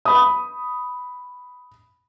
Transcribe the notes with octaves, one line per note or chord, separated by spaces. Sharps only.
B5 D#6